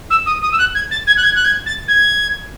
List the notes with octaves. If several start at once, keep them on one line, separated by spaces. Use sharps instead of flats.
E6
D#6
D#6
E6
F#6
G#6
A6
G#6
F#6
G#6
F#6
G#6
A6
G#6